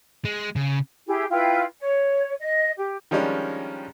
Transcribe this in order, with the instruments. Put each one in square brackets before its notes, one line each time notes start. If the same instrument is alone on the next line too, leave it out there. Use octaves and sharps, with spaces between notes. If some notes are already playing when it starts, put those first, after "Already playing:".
[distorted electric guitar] G#3
C#3
[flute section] E4 G4 G#4
E4 F4 B4 G5
C#5
D#5
G4
[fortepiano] D#3 F3 G3 G#3 C#4 D4